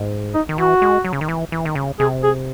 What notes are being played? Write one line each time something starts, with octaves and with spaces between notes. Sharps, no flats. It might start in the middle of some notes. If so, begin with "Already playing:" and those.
Already playing: G#2
D#4
D#3
E3 F#4
G#3
F#3
C#3
D#3
E3
E3
D#3
C#3
C3 G#4
G#4